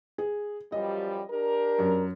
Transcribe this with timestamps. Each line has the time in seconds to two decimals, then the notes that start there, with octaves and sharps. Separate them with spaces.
0.18 G#4
0.72 F#2 F3 G3 D#5
1.30 D4 G4 A#4
1.79 F#2